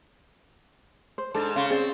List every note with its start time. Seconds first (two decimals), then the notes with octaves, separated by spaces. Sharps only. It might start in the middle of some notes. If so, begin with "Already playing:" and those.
1.18 C5
1.34 G#2 D4 A4
1.56 C#3 F5
1.70 C4 G#4 C5 D5